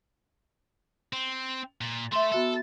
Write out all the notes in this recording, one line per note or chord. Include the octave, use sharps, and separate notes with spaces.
C4
A#2
A3 A4 E5 C6
B3 F#4 A4 E5